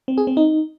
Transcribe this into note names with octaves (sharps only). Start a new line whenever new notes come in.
C4
G#4
C4
D#4